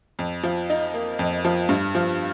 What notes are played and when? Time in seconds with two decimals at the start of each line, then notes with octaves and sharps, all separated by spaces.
0.19 F2
0.43 F3
0.70 D#4
0.94 A#3
1.19 F2
1.45 F3
1.69 G2
1.95 F3